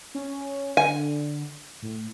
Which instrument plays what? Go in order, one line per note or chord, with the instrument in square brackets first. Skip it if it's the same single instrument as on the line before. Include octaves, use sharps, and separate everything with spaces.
[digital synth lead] C#4
[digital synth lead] D3 [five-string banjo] G#5
[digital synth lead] A2